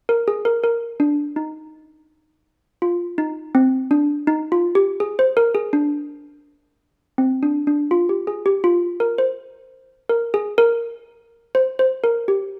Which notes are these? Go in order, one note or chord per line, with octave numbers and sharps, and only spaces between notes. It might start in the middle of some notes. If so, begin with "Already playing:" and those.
A#4
G#4
A#4
A#4
D4
D#4
F4
D#4
C4
D4
D#4
F4
G4
G#4
C5
A#4
G#4
D4
C4
D4
D4
F4
G4
G#4
G4
F4
A#4
C5
A#4
G#4
A#4
C5
C5
A#4
G4